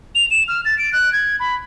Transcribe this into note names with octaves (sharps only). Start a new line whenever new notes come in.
F7
E7
F6
A6
D7
F#6
G#6
B5